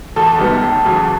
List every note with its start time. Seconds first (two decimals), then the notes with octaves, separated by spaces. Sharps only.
0.16 E2 A4
0.38 C3 D#3 G3 B3
0.62 F1
0.84 E2 C#3 F#3